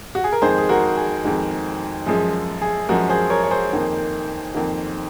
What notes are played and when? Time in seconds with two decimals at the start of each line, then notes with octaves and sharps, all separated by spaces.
0.15 F#4
0.24 G#4
0.32 A#4
0.42 F2 D#3 G#3 G#4 C5
0.58 G#4
0.69 F#4 A#4
0.97 G#4
1.24 F2 D#3 G#3
2.06 F#2 F3 G#3 G#4
2.61 G#4
2.89 F#2 F3 G#3 F#4 A#4
3.09 G#4 C5
3.30 A#4 C#5
3.43 C#5
3.51 G#4 C5
3.72 F2 D#3 A#3
4.54 F2 D#3 A#3